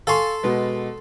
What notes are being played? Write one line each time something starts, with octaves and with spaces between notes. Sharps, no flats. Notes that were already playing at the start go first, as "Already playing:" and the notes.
A4 F5 G#5 C6 C#6
B2 G#3 B3